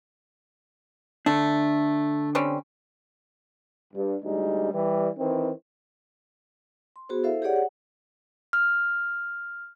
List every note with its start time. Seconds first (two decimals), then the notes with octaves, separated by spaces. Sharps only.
1.26 D3 A3 D4
2.35 G3 C4 C#4
3.94 G2
4.22 D2 G3 G#3 D#4
4.72 E3 G3
5.18 D#3 E3 C4
6.96 C6
7.09 B3 F#4 G#4 C5
7.23 E4 A4 C5 E5 F5
7.42 G4 G#4 C#5 D5 F#5
7.56 F#5
8.53 F6